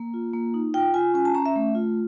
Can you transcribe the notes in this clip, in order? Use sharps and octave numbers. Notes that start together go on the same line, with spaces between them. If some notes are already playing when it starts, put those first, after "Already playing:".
Already playing: A#3
F4
A#3
D#4
F4 G5
F4 G#5
C#4 G#5
A5
C#4 A#5
E5
A3
F4